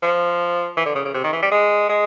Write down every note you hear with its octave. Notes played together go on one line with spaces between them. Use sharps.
F3
E3
D3
C#3
C#3
C3
D#3
E3
G3
G#3
G#3